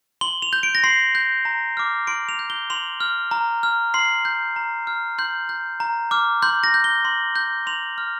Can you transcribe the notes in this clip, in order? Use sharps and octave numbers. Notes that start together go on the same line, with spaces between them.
C6 G7
F7
G6
D7
A#6
C6 C7
G6
A#5
D6 F6
C6 D7
F7
G6
G7
C6 F7
F6
A#5
F6
C6 C7
G6
A#5
F6
C6 G6
G6
A#5
D6 F6
C6 G6
A#6
G6
G7
C6
G6
C6 F7
F6